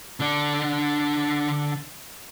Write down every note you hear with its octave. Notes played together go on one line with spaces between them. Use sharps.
D3 D4